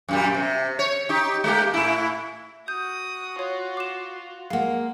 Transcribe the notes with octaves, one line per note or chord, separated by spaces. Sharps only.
F#2 A#2 G3
C3
C#5
D#4 G4
G#3 A#3 G4
A2 E4
F#4 D#6 G6
F4 C#5
D6 E7
G#3 A#3 F5 F#5